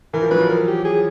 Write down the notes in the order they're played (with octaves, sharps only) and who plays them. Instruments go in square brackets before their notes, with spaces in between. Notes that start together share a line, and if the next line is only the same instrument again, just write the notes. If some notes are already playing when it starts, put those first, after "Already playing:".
[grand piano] E3 [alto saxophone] A#4
[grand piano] F3
[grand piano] F#3 [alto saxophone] B4
[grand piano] F3
[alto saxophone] A#4
G4
G#4